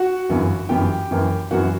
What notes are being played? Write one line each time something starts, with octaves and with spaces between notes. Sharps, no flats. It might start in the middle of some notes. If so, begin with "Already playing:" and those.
Already playing: F#4 F#5
G1 F#2 E3 B3
G1 F#2 E3 B3 G4 G5
F#2 E3 A#3
F#2 E3 A#3 F#4 F#5